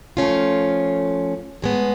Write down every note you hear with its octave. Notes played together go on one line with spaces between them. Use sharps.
F3 A3 C#4 F4
A2 G#3 B3